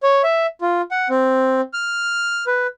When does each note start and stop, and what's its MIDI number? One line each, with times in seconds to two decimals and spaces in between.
0.03 0.22 73
0.23 0.46 76
0.61 0.82 65
0.91 1.08 78
1.10 1.61 60
1.73 2.45 89
2.47 2.67 71